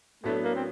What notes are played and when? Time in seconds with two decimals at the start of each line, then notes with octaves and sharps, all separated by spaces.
0.24 A2 F#3 A3 B3 D4
0.43 A#3
0.55 C4